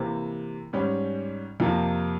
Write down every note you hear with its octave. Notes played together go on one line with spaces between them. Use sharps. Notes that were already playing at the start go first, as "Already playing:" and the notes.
Already playing: C3 E3 A#3
G#2 G3 C#4
F2 C3 F3 A#3